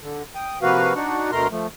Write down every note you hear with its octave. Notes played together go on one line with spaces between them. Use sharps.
D3
G5 D#6
C3 F3 A#3 F#4 B4 F5
D4 D#4 F#4 F#5
D2 B2 A3 A#4 A#5 C6
F3 A3